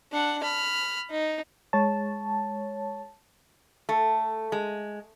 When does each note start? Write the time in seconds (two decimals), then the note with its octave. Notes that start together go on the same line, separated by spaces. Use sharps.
0.12 D4 F#5
0.43 B5 F6
1.10 D#4
1.73 G#3 C#5 A5
3.89 A3
4.52 G#3